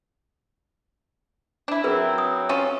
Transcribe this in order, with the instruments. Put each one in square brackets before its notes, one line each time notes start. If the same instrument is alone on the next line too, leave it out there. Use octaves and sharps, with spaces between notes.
[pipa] D4 E4
[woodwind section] F#3 C4 [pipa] E4 [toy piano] G#4 A#4 B4
[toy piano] D#6
[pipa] C#4 F4 A4